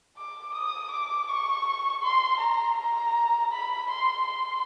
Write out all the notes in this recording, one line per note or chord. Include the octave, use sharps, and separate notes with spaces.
D6
D#6
D6
C#6
C6
A#5
A#5
B5
C6
C6